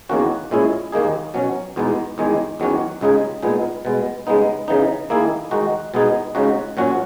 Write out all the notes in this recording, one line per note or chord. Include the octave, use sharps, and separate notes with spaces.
E2 D#3 A#3 C#4 F#4
A#2 G#3 C#4 E4 G#4
D#2 D#3 A#3 D#4 G#4
B2 F#3 C#4
E2 B2 G#3 B3 D#4
E2 D#3 G#3 D#4 G#4
E2 D#3 F#3 C#4 F#4
C#2 C#3 G#3 D#4 G#4
A#2 G#3 B3 D#4 G#4
B2 G#3 B3
C#3 G#3 B3 D#4
C#3 E3 B3 D#4
D#3 A#3 E4 G#4
D#3 G#3 D#4 F#4
B2 G#3 B3 D#4 G#4
C#2 C#3 G#3 D#4 F#4
A#2 F#3 C#4 F#4